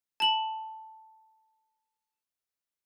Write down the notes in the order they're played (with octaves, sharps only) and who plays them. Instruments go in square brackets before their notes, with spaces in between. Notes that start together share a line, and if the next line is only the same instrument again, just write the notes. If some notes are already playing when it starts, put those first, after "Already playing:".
[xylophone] A5 F#7